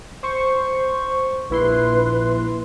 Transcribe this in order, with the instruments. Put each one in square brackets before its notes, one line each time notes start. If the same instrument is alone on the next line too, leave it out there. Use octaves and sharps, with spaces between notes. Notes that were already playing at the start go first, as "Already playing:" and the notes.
[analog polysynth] C5 C#6
[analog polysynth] A#1 E4 C6 [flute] B4